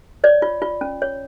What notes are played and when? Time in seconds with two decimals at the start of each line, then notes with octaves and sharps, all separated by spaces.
0.24 C#5 D5
0.42 F4
0.62 F4
0.81 C#4
1.02 C#5